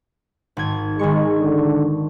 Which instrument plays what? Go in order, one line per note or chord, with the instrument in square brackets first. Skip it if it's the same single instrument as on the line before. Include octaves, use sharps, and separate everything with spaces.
[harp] G#1 G#6
[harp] D#3 C#6 [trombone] G#3
[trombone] D3